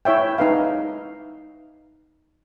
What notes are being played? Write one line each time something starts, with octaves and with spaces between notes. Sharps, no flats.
E4 C#5 E5 G5
D#4 B4 F5